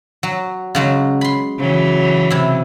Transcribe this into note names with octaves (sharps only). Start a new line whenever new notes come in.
F#3
C#3 F#3 G#3
B5 C6
C#3 E3 F#3
C3 E4